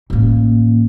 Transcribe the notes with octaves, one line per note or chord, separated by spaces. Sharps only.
A1 A#3